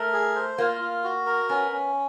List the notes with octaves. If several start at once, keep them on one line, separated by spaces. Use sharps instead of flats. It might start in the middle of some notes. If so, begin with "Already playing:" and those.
Already playing: A3 A#4
G#4
C5
A#3 F4
F4
F#4
A#4
B3 C#4
C#4